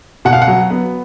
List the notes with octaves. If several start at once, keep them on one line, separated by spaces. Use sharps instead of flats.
B2 F#5
F5
F#5
F#3
B3